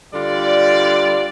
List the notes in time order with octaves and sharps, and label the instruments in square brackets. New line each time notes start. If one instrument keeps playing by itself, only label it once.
[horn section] D3 G3 F4 D5